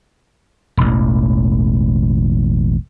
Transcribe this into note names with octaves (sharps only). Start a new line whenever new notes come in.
E1 A1